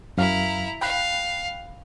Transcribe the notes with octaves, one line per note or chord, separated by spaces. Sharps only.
F#2 E4 F5 A#5
F5 G5 B5 F#6